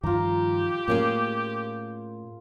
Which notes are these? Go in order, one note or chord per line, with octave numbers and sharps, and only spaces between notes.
G2 D#3 F3 F4 G4 A#5
A2 A#3 C#4 G#4